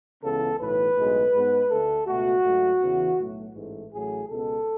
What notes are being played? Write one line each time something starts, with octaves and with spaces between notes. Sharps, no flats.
C#2 C#3 E3 B3 A4
B1 A2 E3 B4
B1 A2 G#3
G#2 G#3 B3
D2 D3 A3 A4
C#2 B2 A3 F#4
G#2 F#3 A3
E2 C#3 E3 B3
B1 A2 F#3 A3
A1 G#2 E3 A3
A1 A2 F#3 A3 G#4
C#2 B2 G#3 B3 A4